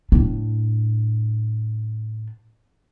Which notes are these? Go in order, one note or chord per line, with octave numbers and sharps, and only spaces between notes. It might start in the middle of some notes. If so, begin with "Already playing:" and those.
A2 D4